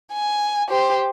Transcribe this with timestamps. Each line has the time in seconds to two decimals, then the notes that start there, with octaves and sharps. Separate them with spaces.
0.13 G#5
0.69 G4 C5